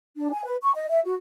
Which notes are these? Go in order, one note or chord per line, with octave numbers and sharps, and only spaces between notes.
D4
G#5
B4
C#6
D#5
E5
F#4